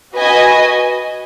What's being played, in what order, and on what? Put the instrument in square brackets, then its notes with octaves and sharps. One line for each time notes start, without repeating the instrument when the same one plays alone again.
[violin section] F#4 B4 D#5 G#5